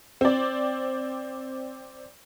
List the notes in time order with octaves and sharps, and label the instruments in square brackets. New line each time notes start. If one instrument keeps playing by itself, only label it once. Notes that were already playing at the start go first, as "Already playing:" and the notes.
[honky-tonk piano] C4 D5